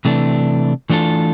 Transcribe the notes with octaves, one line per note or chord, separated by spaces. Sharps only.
C3 E3 A3 D4
E3 A3 D4 F4 A4